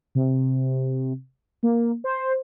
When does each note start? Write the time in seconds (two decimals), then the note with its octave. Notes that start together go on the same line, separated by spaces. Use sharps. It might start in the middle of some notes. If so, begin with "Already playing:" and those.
0.15 C3
1.63 A#3
2.04 C5